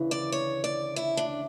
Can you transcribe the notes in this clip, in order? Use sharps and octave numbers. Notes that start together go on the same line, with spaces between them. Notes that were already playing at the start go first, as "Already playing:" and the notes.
Already playing: D2 C#3 E3
D5
C#5
D5
E4
D4